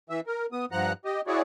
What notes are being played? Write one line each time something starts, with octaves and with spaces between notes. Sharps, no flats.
E3 E5
A#4
B3 D#6
G2 F3 F#5 A#5 F#6
G4 D#5
E4 F#4 G#4 C#5 D5